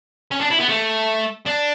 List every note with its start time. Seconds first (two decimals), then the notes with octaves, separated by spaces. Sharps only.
0.31 C#4
0.41 D4
0.50 E4
0.60 B3
0.69 A3
1.46 D4